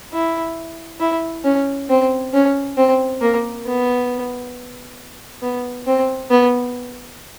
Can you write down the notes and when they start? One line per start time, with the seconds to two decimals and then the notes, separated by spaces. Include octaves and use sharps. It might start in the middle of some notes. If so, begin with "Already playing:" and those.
0.13 E4
1.00 E4
1.44 C#4
1.89 C4
2.34 C#4
2.77 C4
3.21 A#3
3.66 B3
5.42 B3
5.87 C4
6.30 B3